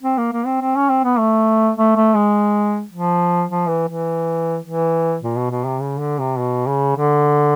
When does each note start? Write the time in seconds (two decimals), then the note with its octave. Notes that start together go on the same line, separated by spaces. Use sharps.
0.03 C4
0.18 A#3
0.32 A#3
0.46 C4
0.61 C4
0.76 C#4
0.89 C4
1.04 B3
1.18 A3
1.77 A3
1.96 A3
2.15 G#3
2.92 F3
3.49 F3
3.68 E3
3.88 E3
4.65 E3
5.23 A#2
5.37 B2
5.51 B2
5.65 C3
5.81 C#3
5.99 D3
6.19 C3
6.39 B2
6.67 C#3
6.96 D3